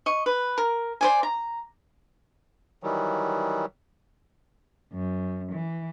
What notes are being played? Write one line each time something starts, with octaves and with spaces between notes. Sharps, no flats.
D#5 C#6
B4
A#4
C5 D5 G#5
A#5
D#3 E3 F#3 G3
F#2
E3